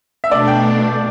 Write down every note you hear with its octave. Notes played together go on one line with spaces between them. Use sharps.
E5
B2 A3 D4 D5
G5